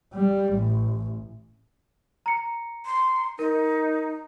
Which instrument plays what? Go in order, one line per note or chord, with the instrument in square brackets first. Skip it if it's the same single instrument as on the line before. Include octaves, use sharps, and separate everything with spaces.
[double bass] G3
A1
[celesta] A#5 C#7
[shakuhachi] C6
[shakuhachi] D#4 [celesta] A#4